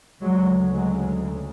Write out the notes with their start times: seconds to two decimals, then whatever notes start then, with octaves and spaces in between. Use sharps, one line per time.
0.22 D2 C#3 F#3 G#3
0.74 F#3 G#3